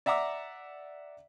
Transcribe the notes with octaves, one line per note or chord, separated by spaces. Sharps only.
D5 E5 F#5 A#5 D6 E6